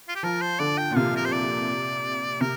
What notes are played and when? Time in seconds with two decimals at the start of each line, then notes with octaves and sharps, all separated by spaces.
0.08 F4
0.15 G4
0.23 F3 A#4
0.41 C5
0.59 D3 D5
0.78 G5
0.91 A#2
0.96 C3 F5
1.16 A#4
1.25 C5
1.32 D5
2.41 C3 A#4